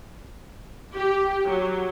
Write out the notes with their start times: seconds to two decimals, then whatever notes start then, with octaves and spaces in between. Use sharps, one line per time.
0.96 G4
1.46 F#3